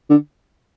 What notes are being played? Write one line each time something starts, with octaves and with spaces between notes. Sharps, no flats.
D3